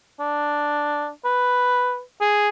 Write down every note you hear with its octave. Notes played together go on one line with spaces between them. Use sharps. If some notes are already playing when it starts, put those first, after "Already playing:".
D4
B4
G#4